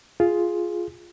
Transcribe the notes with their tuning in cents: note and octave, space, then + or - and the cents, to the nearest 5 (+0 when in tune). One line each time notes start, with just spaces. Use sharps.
F4 +0 G#4 +5